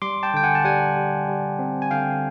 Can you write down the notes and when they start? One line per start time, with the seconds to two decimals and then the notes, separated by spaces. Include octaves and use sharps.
0.02 G3 C6 D6
0.23 G5 A5
0.34 D3 G5
0.44 F#5 G#5
0.55 A5
0.65 G3 F#5 G#5
0.96 G3
1.28 G3
1.59 C4
1.82 G#5
1.91 D3 F5 G5